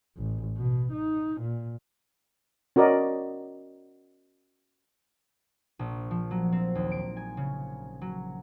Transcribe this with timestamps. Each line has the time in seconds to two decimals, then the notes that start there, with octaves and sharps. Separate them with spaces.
0.17 A1
0.57 B2
0.93 D#4
1.42 A#2
2.76 C#4 F#4 A#4 D5 D#5
5.79 A#1
6.11 F3
6.31 F#3
6.52 C4
6.75 D#2
6.92 D7
7.16 G#5
7.37 C#3
8.01 F#3